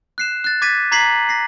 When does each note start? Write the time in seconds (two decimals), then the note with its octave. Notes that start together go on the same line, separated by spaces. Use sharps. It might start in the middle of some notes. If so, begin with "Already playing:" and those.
0.18 F#6 C7 E7
0.44 F#6 A6
0.62 D6 G#6 A6 B6 D#7
0.92 A#5 D6 G#6 B6 C7 F#7
1.29 A#6 C7